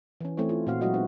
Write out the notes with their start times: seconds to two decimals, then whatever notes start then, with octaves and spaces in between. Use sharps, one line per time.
0.21 E3 C#4
0.37 E3 A3 C4 C#4 E4 C#5
0.49 F4
0.67 A#2 A3 C4 F#4 F5
0.81 F#3 G#3 E4 F#4 D#5 F5
0.94 B3 C4 D#4